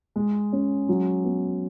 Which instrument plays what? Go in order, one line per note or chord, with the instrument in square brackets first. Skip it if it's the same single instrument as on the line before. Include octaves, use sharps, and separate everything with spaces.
[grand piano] G#3
C#4
F#3
B3